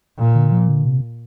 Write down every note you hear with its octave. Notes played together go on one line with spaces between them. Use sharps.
A#2
D3
F3
D3
C3